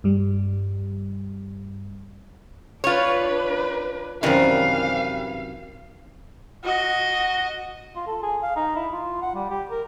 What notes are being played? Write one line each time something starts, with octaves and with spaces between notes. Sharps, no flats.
G2 G3
D4 F4 B4 C#5
F#2 C3 D#3 E3 G3 F5
F#4 D#5
F4
A4
G#4
F5
D#4
E4
F4
F#5
G3
G4
A#4